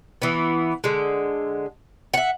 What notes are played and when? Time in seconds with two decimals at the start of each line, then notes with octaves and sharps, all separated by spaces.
0.22 E3 B3
0.84 D3 G#3
2.14 E5 F#5